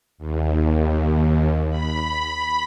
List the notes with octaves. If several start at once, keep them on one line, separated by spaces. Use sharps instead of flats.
D#2
B5